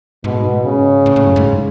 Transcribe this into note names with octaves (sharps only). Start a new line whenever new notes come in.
G#2 B2
A2
G#2
C#3
A2
A2
F#2
G#2